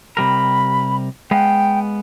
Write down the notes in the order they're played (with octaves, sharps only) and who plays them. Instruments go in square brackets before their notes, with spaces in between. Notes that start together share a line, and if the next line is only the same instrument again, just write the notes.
[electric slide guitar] C3 G3 A#4 [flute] B5
[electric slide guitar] G#3 B3 F5 [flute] G5